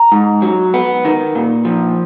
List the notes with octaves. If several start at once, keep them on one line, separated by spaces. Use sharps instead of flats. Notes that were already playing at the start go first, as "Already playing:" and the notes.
Already playing: A#5
G#2
F#3
B3
D#3
A#2
F3